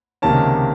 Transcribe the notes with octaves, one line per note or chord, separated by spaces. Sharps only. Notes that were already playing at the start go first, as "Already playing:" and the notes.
C#2 C3 D#3 A#3 C#4 A5